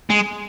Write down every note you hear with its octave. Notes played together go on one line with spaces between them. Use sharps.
G#3